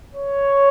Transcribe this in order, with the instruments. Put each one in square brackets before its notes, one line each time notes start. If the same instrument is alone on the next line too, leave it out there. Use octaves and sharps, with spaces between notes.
[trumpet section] C#5